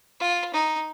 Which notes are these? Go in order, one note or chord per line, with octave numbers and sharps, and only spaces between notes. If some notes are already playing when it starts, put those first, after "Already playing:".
F4
D#4